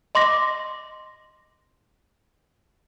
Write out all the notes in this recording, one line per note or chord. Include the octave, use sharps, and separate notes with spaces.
D#5 C6 D6 A#6